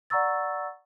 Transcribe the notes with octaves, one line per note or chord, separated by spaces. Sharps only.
D5 F#5 A#5 C#6 E6 A6